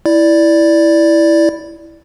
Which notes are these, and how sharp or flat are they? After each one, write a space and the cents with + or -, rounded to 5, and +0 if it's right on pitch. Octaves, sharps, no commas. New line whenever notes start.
E4 +0 D5 +0